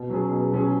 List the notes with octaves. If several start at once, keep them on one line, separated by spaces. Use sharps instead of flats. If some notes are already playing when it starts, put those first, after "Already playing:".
Already playing: B2
F#3 C#4 G#4
B2
F#3 C#4 G#4